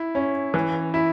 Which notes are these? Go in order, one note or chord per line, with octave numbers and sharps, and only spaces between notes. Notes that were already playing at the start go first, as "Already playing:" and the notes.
Already playing: E4
C#4
E3
E4